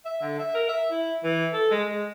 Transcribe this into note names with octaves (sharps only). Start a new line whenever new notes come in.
E5
D3
E5
A#4
E5
E4
E3
A4
G#3
G#3